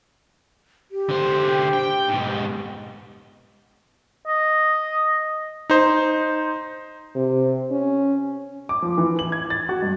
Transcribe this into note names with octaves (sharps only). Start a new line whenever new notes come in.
G4
D3 C5
G5
G#2 B2
D#5
D#4 C5
C3
C#4
D6
F3
E3
F#7
G#6
A6
F#4
G2